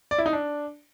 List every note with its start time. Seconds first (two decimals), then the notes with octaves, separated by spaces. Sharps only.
0.11 D5
0.18 E4
0.26 D#4
0.33 D4